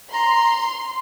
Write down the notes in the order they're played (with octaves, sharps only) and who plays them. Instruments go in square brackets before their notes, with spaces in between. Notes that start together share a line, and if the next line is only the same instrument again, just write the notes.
[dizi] A#5 [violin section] C6